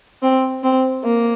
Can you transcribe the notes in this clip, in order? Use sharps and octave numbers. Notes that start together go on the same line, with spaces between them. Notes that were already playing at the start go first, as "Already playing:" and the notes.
C4
C4
A#3